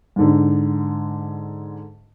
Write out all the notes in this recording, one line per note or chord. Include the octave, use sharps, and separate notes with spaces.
G#2 D3